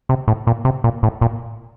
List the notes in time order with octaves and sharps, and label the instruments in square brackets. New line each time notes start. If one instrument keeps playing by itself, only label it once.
[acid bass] C3
A2
A#2
C3
A#2
A2
A#2